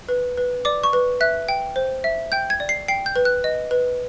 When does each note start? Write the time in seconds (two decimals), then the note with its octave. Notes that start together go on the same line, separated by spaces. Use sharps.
0.09 B4
0.38 B4
0.65 D5 D6
0.83 C#6
0.93 B4
1.21 E5 F#6
1.49 G5
1.76 C5
2.04 E5
2.32 G5 G6
2.50 G#6
2.60 D5
2.69 C7
2.88 G5 C7
3.06 G6
3.16 B4
3.25 F#6
3.44 D#5
3.71 B4